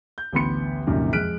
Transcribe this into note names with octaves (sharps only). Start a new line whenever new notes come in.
G6
A1 D2 B3 B5 C6 C#7
C2 F#2 A#2 D3 D#3
F2 G#3 F6 F#6 B6 D7